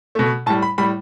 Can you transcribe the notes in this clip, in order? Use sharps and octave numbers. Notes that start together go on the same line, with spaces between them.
B2 A3
A2 G3 A5
B5
A2 G3 B5